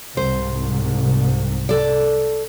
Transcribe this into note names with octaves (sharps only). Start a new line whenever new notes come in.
C2 G#2 C5
A4 D5